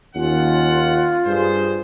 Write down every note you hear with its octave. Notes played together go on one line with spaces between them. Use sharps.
D#2 C#4 F4 F#5
G2 G#4 C5